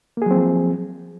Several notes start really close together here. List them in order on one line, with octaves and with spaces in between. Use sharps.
A#3 G#4 F#3 C4 F3